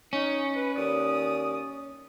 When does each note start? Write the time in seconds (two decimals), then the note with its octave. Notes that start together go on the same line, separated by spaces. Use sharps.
0.13 C#4 D#4
0.56 B4
0.76 D#2 D5 D#6